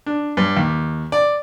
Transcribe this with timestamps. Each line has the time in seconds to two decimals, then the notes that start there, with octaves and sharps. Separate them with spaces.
0.06 D4
0.37 G2
0.57 D#2
1.12 D5